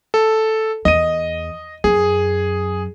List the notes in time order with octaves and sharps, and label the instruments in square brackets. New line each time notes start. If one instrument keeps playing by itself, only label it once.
[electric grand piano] A4
[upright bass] E2 [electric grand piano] D#5 D#7
[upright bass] F#2 [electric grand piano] G#4